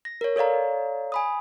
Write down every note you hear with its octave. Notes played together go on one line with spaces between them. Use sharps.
A#6
A#4 C#5
A4 C#5 D5 F5 A#5
G#5 B5 D#6